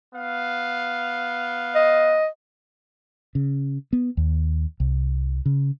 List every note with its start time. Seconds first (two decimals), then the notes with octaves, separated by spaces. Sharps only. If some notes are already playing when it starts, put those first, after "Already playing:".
0.15 B3 F5
1.75 D#5
3.35 C#3
3.93 B3
4.17 D#2
4.80 C2
5.46 C#3